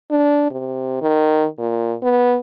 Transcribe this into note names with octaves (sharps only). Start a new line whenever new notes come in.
D4
C3
D#3
A#2
B3